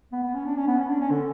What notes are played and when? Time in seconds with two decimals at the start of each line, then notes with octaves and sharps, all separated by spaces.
0.12 B3
0.23 B3
0.34 C#4
0.46 D4
0.56 C#4
0.67 B3
0.78 C#4
0.89 D4
1.00 C#4
1.11 D3